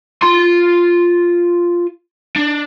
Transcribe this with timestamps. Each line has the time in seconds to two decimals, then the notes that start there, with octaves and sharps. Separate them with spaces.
0.22 F4 C6
2.36 D4